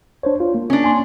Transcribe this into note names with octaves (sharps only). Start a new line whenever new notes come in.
D4 C5 C#5
F4
A#3
C#4 D4
G#5 C6